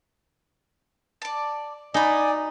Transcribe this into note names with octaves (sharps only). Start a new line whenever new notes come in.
D5 A5
D#4 F#4 D5 G#5 B5